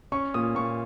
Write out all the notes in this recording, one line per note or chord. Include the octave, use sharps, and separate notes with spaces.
C#4 C#6
A#2 D#6
A#2 C#6